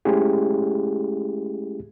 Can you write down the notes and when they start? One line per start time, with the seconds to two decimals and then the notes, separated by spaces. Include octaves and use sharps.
0.05 G#3 A3 C#4 E4 G4 G#4